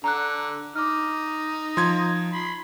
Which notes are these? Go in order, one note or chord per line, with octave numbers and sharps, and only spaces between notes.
D3 A#5 F#6
D#4 D6 F6
F3 C6 G#6
B5 C6